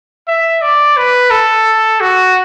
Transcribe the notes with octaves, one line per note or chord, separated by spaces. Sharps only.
E5
D5
B4
A4
F#4